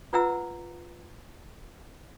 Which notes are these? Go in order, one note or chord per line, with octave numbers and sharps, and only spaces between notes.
F4 B4 E5 F#5 A#5 E6